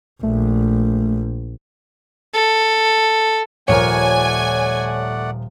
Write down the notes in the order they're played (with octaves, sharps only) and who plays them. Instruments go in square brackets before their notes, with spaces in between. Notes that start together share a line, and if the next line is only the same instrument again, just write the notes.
[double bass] A#1 [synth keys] A3
[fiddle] A4
[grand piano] D#1 F3 A#4 [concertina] A3 D5 F#5 [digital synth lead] C#5 [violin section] G#5